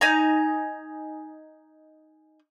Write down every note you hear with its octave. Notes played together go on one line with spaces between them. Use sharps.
D#4 G#5 A#5